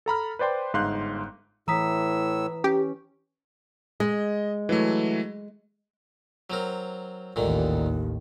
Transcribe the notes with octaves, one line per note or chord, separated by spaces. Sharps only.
A4 A#5 B5 F6
B4 C5 D5 G5 C6
G1 G#2 F5 C6 F#6 G6
A2 E3 A#5 D#6 E6 B6
C#4 G4
G#3 D#5
E3 F#3 A3
F#3 C4 A#4
A1 D#2 A#2 D3 D#3